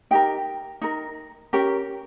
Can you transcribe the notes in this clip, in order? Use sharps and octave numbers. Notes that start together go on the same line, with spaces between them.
D#4 G4 A#4 G5
D#4 A#4
C#4 G4 A#4